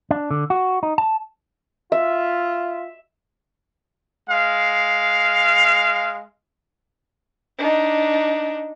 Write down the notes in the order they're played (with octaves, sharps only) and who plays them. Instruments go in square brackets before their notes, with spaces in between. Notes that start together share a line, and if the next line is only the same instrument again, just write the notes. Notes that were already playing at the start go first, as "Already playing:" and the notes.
[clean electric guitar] D4
D3
F#4
D#4
A5
[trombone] F4 [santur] E5
[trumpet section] G#3 F5
[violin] D4 D#4